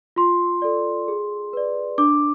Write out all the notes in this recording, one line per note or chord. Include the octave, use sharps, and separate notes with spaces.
F4 C6
A4 D5
G#4
B4 D5
D4 D6